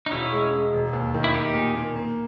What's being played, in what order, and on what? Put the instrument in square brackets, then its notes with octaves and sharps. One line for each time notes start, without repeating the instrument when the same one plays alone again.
[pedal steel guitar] D#4
[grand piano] E1 [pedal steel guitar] C#4 E4
[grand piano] G#3
G#3
E1
D#2
D#3
[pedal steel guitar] E4
[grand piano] A#3 [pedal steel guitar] D#4 G4
[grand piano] A#2
A#3
A#3